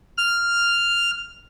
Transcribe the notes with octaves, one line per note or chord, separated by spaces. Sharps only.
F6